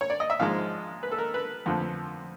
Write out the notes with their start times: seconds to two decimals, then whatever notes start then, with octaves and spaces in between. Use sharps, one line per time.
0.01 C#5
0.10 D5
0.20 D#5
0.30 E5
0.39 G#2 F3 G#3 F5
1.03 B4
1.11 A4
1.18 A#4
1.34 B4
1.66 F2 D3 F3 A3